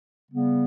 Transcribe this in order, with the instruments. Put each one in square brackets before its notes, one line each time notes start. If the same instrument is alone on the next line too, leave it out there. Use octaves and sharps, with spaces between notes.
[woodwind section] C#3 G3 B3